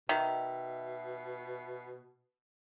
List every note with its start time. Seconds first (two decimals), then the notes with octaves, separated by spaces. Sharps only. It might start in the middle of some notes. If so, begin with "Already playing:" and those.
0.09 B2 D#3 E5